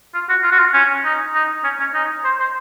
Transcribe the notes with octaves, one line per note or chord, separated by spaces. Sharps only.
F4
F#4
F4
F#4
F4
C#4
D#4
D#4
C#4
C#4
D#4
C5
C5